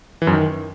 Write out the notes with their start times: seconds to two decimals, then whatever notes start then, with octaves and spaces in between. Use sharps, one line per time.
0.22 E3
0.27 F#2
0.33 D#3